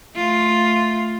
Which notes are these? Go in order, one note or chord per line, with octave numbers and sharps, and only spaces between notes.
A3 F4